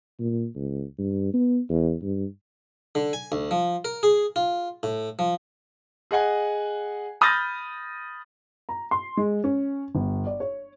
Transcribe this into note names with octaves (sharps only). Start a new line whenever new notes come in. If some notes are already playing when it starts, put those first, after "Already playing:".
A#2
C#2
G2
B3
E2
G2
D3
G#5
D2
F3
A#4
G#4
F4
A2
F3
G#4 D#5 F#5 G#5
B5 D#6 F6 G6 A6 A#6
A#5
C6
G#3
C#4
G1
D5
C#5